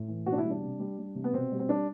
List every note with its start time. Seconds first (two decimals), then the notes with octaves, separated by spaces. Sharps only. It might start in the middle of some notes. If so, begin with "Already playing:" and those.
Already playing: A2
0.08 E3
0.26 B2 F#4
0.32 D4
0.38 E4
0.44 G3
0.50 D4
0.61 C3
0.80 G3
0.98 G3
1.15 C3
1.24 B3
1.33 B2 C4
1.51 G3
1.59 C4
1.69 G3 D4